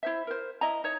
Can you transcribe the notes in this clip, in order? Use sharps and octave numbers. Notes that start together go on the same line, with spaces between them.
E4 C5 E5
A#4 C5
E4 D#5 A#5
D#4 C#5